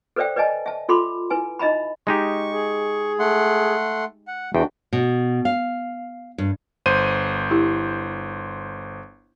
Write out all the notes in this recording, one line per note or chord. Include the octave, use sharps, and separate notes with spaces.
A4 B4 C5 D5 E5 G5
B4 D5 D#5 G#5 A5
E5 A5
F4 A4 B5 C6 D6
E4 B4 G#5
D#4 D#5 E5 A#5 B5
G#3 D#4 G4 C#6
G#4
A3 F#5 C6
F#5
E2 D4 F#4 G5
B2
F5
G2
G1 C5 D#7
E4 G4